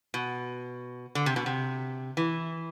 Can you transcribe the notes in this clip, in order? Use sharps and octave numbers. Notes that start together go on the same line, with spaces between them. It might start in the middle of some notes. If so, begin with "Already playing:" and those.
B2
D3
C3
B2
C3
E3